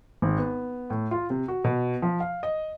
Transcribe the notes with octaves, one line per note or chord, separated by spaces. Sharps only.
G#1
B3
A2
F4
C3
F#4
B2
F3
F5
D#5